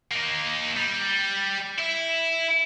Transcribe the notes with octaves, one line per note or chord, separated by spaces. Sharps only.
A#3 D#4
G3
E4 E5